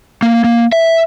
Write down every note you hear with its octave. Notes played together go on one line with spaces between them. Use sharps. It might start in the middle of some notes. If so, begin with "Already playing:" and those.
A#3
A#3
E5